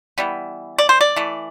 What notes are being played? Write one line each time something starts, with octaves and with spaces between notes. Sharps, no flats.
E3 G3 B3
D5
C5
D5
E3 A3